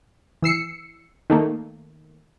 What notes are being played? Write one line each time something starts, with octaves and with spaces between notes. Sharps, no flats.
E3 E6 C7 C#7
D#3 A3 A#3